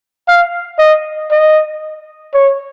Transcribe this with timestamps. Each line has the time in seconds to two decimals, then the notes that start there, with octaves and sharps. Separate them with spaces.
0.28 F5
0.78 D#5
1.31 D#5
2.34 C#5